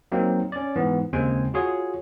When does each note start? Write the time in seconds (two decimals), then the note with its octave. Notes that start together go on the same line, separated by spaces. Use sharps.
0.12 F#3 A#3 C4 D#4
0.52 C#4 D5
0.76 G#2 E3 B3
1.13 D#2 C#3 G#3 C4 G5 G#5
1.54 F4 F#4 G#4 C#5